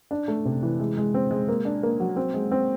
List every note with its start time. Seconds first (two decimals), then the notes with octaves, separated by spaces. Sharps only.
0.11 D4
0.28 A3
0.45 C3
0.63 E3
0.80 G#3
0.97 G#3
1.14 C4
1.31 G#3
1.48 A#3
1.65 D4
1.83 A#3
2.00 F#3
2.16 C4
2.34 G#3
2.52 C4